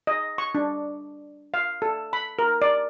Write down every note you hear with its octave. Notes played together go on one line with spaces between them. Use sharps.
D#5
C#6
D4
F5
A4
B5
A#4
D5